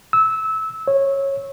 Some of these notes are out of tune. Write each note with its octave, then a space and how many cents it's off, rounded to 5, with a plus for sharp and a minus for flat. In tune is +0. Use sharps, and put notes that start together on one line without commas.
E6 -20
C#5 -15